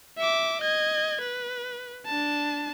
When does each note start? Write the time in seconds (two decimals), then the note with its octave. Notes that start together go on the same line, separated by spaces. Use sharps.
0.18 E5 D6
0.61 D#5 G#6
1.21 B4
2.06 D4 A5